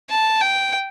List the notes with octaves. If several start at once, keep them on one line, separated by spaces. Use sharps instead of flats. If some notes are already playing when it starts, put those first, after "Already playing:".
A5
G5